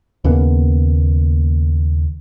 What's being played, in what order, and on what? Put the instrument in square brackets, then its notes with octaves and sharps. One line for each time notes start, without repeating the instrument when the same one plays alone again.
[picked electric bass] D#2 C#3 A#3 B3